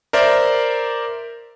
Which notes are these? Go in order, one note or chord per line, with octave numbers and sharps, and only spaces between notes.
A#4 C5 D5 E5